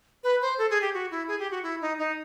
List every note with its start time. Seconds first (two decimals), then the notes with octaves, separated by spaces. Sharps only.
0.24 B4
0.42 C5
0.58 A4
0.70 G#4
0.82 G4
0.94 F#4
1.11 E4
1.28 G#4
1.39 G4
1.51 F#4
1.63 E4
1.81 D#4
1.99 D#4